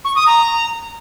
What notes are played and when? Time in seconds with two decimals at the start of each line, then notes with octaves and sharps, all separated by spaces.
0.05 C#6
0.16 D#6
0.27 A#5